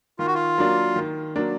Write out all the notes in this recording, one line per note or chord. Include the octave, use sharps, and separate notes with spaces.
D#3 F4
F#4
F4
F#3 A#3 D4
D#3
F#3 A#3 D4